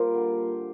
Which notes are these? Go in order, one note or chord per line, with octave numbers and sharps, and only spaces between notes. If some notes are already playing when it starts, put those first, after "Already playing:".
Already playing: A#2 G3 A#3 A#4 C5 D5
D3